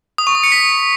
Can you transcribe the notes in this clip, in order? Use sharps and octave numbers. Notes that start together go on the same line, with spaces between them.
D#6
C#6
D#6
C#7
B6